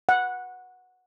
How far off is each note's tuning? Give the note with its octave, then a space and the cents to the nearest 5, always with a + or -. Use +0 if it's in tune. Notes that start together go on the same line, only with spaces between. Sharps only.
F#5 -10